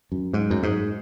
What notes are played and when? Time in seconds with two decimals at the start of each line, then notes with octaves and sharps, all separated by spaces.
0.12 F#2
0.33 G#2
0.50 F#2
0.63 G#2